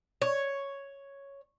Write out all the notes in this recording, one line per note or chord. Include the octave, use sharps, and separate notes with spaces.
C#5